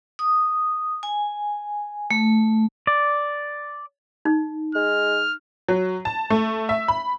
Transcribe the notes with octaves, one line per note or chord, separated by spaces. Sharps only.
D#6
G#5
A3
D5
D#4
G#3 F6
F#3
A5
A3
E5
B5